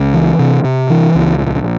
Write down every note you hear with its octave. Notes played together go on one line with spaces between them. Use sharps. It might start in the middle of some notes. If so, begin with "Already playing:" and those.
Already playing: C#2
E3
C3
C3
E3
C#2
A#1